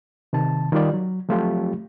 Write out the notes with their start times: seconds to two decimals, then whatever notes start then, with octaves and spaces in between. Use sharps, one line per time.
0.33 C3 D#3 A5
0.72 D#3 G3 F4 G4 D5
0.94 F#3
1.29 F3 F#3 A3 C4 F4 G4